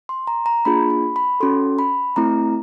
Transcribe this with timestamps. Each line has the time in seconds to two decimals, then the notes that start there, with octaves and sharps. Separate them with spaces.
0.09 C6
0.27 A#5
0.46 A#5
0.65 A#3 D4 F4 G#4 B5
0.90 B5
1.16 B5
1.40 C#4 F#4 A4 C6
1.79 B5
2.16 A3 C4 E4 A#5